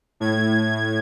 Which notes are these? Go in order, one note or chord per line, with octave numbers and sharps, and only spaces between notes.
A2 G#6